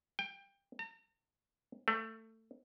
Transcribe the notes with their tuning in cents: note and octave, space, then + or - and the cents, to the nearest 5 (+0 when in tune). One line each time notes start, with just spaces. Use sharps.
G5 +20
A#5 -45
A3 +20